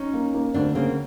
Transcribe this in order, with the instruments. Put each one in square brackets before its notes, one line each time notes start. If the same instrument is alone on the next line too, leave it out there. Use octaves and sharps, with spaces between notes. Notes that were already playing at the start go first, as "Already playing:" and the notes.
Already playing: [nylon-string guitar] C#4 D#4
[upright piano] A#3
A#3
[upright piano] D2 [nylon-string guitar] C4 D4
[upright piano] C#3 [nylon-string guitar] A#3 C4